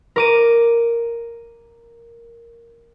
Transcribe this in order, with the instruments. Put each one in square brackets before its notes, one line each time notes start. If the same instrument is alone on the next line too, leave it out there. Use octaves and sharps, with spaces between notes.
[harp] A#4 D6 D#7